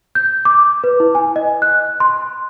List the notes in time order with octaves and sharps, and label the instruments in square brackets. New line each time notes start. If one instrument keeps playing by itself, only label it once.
[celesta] G6
D6
B4
E4
G#5
D#5
F#6
C6